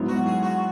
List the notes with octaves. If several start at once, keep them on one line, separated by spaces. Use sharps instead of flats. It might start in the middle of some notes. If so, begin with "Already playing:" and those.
Already playing: G#2 F#3 B3 E4
F#4
G#4
F#4